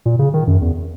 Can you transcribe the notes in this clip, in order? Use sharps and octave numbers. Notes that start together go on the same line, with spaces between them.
A#2
C#3
D#3
F#2
E2